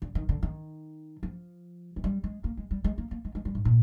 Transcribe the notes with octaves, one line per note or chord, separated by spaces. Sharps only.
D3
D#3
D3
D#3
F3
G#3
G3
G#3
A#3
G#3
G3
G#3
A#3
A#3
G#3
G#3
G3
G#2
A#2